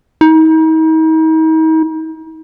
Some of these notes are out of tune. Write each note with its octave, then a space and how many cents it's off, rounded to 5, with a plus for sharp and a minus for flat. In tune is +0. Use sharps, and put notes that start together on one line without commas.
D#4 +40